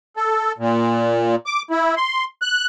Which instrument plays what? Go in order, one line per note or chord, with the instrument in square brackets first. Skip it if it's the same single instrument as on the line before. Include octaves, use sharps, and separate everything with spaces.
[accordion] A4
A#2
D6
E4
C6
F#6